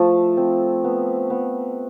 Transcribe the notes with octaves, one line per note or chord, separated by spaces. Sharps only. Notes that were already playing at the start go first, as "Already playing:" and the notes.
Already playing: F3 A3
C4
B3
B3